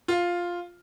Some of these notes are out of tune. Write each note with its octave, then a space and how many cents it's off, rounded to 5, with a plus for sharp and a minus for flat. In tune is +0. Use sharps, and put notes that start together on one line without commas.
F4 +5